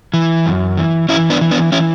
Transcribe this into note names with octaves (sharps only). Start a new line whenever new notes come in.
E3
F#2
E3
E3 C#4 E4
B3 D4
E3
B3 D4
E3 C#4 E4